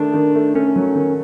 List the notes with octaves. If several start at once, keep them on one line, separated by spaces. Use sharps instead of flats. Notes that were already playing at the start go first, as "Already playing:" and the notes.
Already playing: D#3 A3 D4
D#3
A3
A3 C#4
F#3
D#3